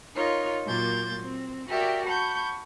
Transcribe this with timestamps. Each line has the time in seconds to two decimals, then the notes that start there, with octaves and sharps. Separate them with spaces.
0.16 D#4 F4 A#4 C#5
0.64 A#2 F#3 A#3 C6 G6 A6
1.22 C4
1.68 F#4 G4 A#4 D5 E5 G5
2.06 F#5 A5 B5 C#6 G6